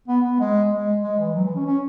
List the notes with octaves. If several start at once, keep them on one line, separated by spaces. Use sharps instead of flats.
B3
B3
G#3
G#3
G#3
E3
F#3
E3
C#4
C#4